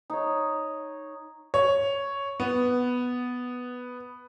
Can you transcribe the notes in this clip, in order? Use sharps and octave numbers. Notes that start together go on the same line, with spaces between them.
D#4 C#5
C#5
B3